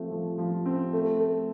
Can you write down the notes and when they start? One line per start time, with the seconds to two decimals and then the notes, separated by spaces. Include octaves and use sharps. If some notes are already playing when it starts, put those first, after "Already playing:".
Already playing: F3 A3 C4
0.11 F3
0.38 F3
0.66 C4
0.93 A3
1.20 A3